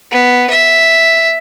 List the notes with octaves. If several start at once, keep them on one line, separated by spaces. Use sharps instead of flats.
B3
E5